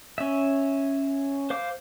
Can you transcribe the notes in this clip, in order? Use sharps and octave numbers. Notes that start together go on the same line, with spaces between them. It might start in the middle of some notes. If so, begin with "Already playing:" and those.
C#4 E5
C5 F5 D6